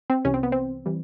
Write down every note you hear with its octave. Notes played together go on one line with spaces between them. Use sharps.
C4
C2 C3 E3 C#4
C4
B3
C4
E3 G3